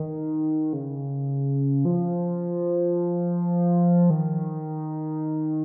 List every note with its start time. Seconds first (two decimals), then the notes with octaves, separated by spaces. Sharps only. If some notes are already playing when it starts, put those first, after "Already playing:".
Already playing: D#3
0.73 C#3
1.85 F3
4.10 D#3